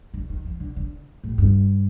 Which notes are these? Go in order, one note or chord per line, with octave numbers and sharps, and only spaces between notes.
D3
D#3
F3
D3
D3
A2
G2